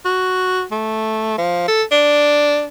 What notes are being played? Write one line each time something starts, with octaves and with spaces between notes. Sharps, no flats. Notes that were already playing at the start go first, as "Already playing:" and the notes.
F#4
A3
F3
A4
D4